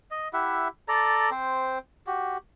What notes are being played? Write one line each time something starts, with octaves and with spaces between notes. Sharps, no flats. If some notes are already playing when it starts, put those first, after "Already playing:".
D#5
E4 G4 E5 F#5
A4 D5 A#5
C4 C5
F#4 G4